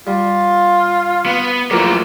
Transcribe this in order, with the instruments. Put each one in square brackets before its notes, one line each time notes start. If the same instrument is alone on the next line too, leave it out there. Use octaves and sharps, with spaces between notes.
[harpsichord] G3 [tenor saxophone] F4
[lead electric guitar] B3
[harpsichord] E2 F3 [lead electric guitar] F#3 A3 [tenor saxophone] A#3